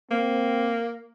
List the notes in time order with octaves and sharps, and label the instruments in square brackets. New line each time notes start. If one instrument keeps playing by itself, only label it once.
[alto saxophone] A#3 [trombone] C4